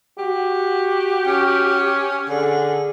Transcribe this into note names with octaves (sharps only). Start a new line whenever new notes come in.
F#4 G4
C#4
D3 G#4